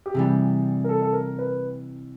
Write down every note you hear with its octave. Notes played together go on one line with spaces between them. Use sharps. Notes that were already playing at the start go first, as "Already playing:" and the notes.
G4
C3 E3 G3 G#4
A#4
A4
A4
A#4
B4